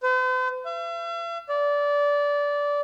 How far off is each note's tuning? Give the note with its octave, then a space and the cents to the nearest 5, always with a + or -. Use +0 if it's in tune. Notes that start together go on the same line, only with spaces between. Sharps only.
C5 -45
E5 +45
D5 -20